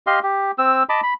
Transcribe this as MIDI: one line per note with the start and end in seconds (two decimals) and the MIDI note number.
0.07 0.19 67
0.07 0.19 75
0.07 0.19 77
0.07 0.19 84
0.23 0.51 67
0.58 0.83 60
0.58 0.83 88
0.89 1.01 75
0.89 1.01 81
0.89 1.01 83
0.89 1.01 86
1.03 1.14 83